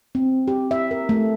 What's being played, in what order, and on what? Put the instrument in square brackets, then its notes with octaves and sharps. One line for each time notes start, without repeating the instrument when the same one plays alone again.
[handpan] C4
G4
E5
A#4
A3